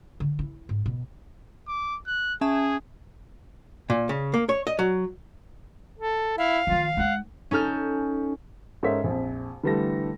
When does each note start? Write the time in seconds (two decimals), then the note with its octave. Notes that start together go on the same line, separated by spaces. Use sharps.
0.20 D3
0.39 E4
0.69 G#2
0.86 B2
1.68 D6
2.06 F#6
2.41 C#4 G#4 E5 A5
3.90 A#2
4.09 C#3
4.34 A#3
4.49 C#5
4.67 D#5
4.79 F#3
5.98 A4
6.38 E4 F5
6.67 D#3 F3 F4
6.97 G#3 D#4 F#5
7.51 C#4 D#4 A4 F6 G6
8.83 G#2 C#4 A4 A#4 E5 B6
9.04 A#1 F2
9.63 D3 E3 G3 A3 A4 A#6